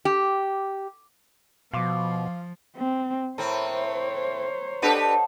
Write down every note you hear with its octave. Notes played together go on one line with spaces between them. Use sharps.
G4
B2 F3 F5 C6 D6
C4
A2 C4 A#4 C5 C#5
D4 G4 A4 B4 D#5 F#5